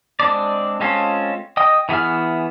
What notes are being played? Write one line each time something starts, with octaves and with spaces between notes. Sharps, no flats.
G#3 C4 D4 D5
G#3 C4 C#4 F4 A4
D#5 G5 D#6
E3 B3 G#4 E5 F6